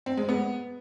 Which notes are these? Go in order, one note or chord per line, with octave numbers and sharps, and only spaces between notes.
C4
G#3
B3